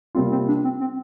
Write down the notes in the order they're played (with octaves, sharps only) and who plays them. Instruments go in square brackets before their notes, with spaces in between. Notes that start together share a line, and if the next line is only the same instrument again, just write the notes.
[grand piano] C3 G3 A#3 F4 [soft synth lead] C4
[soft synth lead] C4
D4
C4
C4